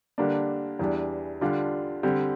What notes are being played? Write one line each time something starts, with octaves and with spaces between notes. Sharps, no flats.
D3 G3 A#3 D4
E2 E3 G3 D4
D3 G3 D4 F4
D3 G3 C4